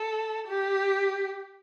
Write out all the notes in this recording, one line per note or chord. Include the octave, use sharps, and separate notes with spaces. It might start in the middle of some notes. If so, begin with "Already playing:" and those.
Already playing: A4
G4